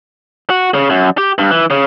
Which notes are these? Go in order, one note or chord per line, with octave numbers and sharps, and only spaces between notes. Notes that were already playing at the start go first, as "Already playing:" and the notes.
F#4
C#3
F#2
G4
G2
E3
C#3